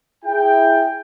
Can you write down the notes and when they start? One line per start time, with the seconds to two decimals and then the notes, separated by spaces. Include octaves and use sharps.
0.24 E4 G#4 G5